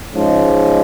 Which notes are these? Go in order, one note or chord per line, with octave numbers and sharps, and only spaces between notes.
G#2 F3 G#3 C#4